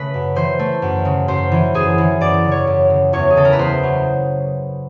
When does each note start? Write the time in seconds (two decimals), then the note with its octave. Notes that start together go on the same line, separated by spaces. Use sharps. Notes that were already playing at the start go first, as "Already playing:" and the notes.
Already playing: C#3 A3 B4
0.14 F#2
0.36 E3 C5
0.59 A3
0.82 F#2
1.05 C#3
1.28 F#2 C5
1.51 E3
1.74 F#2 G#4
1.98 E3
2.21 F#2 D5
2.44 C#3
2.51 C#5
2.67 F#2
2.90 C#3
3.13 E2 C#5
3.30 G#4
3.36 C#3 A4
3.45 A#4
3.52 B4
3.59 E2 C5
3.83 F#3